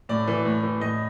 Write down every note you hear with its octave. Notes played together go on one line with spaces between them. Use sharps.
A2 D5
E3
A2
E3
A2 D#5